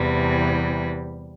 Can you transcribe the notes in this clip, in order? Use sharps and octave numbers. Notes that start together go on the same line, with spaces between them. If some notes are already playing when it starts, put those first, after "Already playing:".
Already playing: E2 C3 E3 G3